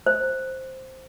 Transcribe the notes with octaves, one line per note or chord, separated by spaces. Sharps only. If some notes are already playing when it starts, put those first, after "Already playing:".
C5